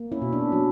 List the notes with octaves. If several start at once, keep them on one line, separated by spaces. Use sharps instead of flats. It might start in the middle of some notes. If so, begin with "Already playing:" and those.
Already playing: A#3
C#4 E4
B2
D4
F#3 C#4